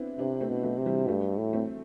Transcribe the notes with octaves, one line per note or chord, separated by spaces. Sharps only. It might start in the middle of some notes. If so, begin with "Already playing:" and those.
Already playing: B3 C4 D4 E4
C3 B3 D4
A3 C4
B2
F#3 A3
C3
E3 G3
G2 F#3 A3
A2
A3 C4